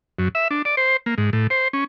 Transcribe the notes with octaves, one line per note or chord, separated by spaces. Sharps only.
F#2
E5
D4
D5
C5
A#3
G#2
A2
C5
C#4